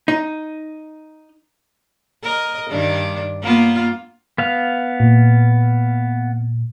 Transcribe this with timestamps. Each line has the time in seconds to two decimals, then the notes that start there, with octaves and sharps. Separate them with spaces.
0.08 D#4
2.22 A#4 D#5
2.69 G2 D#3 D4
3.42 A#3 B3 F4
4.38 B3 F5
5.00 A#2